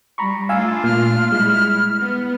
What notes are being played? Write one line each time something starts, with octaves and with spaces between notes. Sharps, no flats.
G3 A#5 B5 C#6
A3 D4 F4 F5 G#5 E6
A#2 F6
G3 G#3 E4
B3